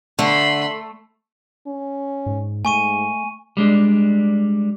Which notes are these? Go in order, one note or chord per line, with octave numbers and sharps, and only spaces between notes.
D3 A3 B5 C6
C#4
G#2
G#2 A3 G#5 C#6 D#7
G3 G#3 D4